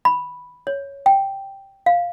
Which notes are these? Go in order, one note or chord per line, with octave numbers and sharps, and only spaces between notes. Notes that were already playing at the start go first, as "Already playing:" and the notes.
B5
C#5
G5
F5